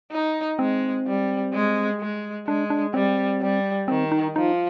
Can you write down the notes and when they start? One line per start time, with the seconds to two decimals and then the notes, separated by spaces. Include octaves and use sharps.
0.12 D#4
0.59 G#3 C4
1.07 G3
1.53 G#3
2.00 G#3
2.47 G#3 D4
2.70 D4
2.94 G3 C4
3.42 G3
3.88 D#3 C4
4.12 D#4
4.36 F3 D#4